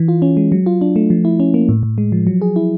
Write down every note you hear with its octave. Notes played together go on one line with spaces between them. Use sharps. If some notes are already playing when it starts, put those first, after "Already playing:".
Already playing: E3
F4
C#4
G#3
F#3
F4
D4
A3
F3
E4
C#4
A#3
A2
A2
G#3
F3
F#3
G#4
E4